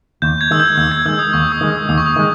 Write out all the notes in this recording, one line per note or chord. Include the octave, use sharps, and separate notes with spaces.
D#2 G6
G#6
D#3 G#3 E6
G6
D#2 E6
G#6
D#3 G#3 E6
D#6
D#2 C#6
D#6
D#3 G#3
D#6
D#2 D#6
C#6
D#6
D#3 G#3